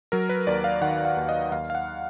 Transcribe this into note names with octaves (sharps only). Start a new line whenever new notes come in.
F#3 A#4
B4
D#2 D5
F5
D#3 F#5
F5
D#2
D#5
D#2 F5
F5
F#5